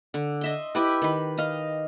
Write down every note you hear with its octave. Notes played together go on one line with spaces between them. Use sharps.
D3
D#5 E5 C6
E4 G4 B4
D#3 B4
D#5 F5